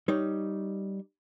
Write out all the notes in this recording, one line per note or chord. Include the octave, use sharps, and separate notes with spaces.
G3 D#4 C#5